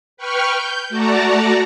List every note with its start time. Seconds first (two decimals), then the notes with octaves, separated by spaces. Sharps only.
0.17 B4 G5 C#6 F6
0.51 G6
0.89 A3 F#4 D5 A5 A#5